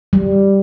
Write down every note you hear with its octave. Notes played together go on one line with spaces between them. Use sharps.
G3